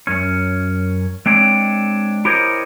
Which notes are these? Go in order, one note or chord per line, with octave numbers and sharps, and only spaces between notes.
F#2 C#4
G#3 C4 D4 C#5
E4 G4 A#4 C5 C#5 D#5